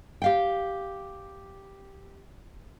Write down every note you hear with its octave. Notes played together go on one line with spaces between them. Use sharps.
G4 F5 G5